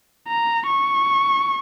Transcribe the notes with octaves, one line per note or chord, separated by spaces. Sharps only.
A#5
C#6